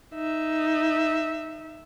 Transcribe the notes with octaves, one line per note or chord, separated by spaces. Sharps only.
D#4 E5